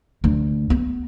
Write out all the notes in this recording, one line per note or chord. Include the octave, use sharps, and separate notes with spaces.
D2
B3